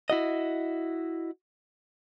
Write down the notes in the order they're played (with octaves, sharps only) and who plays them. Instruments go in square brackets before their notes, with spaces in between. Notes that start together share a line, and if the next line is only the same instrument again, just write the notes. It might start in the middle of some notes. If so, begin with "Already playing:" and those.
[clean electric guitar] E4 F#4 D#5